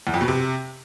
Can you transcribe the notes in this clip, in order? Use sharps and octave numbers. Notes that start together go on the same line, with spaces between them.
E2
F2
B2
C3